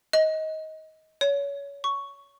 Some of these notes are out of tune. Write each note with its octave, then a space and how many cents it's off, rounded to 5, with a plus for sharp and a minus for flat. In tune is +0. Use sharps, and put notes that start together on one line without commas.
D#5 +20
C#5 +25
C#6 +5